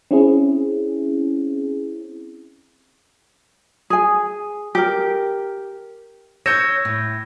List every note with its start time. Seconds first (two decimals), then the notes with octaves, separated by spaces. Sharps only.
0.11 C4 C#4 E4 G#4
3.90 G#4 G#5
4.75 G4 A#4
6.46 C#5 E6 G6 G#6 A#6 C#7 E7
6.85 A2